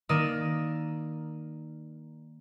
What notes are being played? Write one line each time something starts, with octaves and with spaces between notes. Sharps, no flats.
D#3 A#3 A#4 D5 D#6 E6